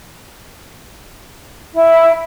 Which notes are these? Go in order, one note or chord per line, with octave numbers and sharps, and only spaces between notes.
E4